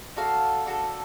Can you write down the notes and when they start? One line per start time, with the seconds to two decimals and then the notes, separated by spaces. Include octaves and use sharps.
0.16 D4 F#4 A4 F5
0.66 D4 F#4 A4